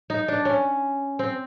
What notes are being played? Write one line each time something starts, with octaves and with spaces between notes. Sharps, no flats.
D#4
D4
C#4
C4